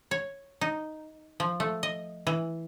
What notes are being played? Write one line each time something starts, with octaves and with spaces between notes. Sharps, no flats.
C#5
D#4
F3
A3
D#5
E3